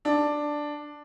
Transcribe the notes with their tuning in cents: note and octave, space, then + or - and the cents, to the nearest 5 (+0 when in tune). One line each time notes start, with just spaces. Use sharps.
D4 +5